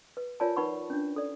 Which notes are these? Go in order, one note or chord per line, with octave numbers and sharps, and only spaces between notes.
B4
F4 A#4 C#5 D5 G#5 A5
D#4 A#4 B4 F#5 B5 C#6
C#4 D4
A4 D5